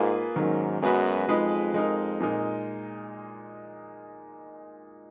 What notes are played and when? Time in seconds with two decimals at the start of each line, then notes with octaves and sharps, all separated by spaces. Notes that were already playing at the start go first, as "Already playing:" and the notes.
Already playing: G#2 A#3 F4 G#4 B4
0.35 G#2 D#3 F#3 A#3 C#4
0.82 F#2 G#3 B3 F#4 B4
1.28 F2 F3 G#3 D#4 G#4 B4
1.74 G#3 D#4 A#4
2.20 A#2 G#3 D#4 A#4